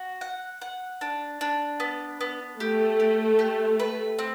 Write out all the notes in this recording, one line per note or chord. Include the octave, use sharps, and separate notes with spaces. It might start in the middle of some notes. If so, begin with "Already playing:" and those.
Already playing: F#4
F#5
F#5
D4
D4
B3
B3
A3 G4
G4
G4
B4
C4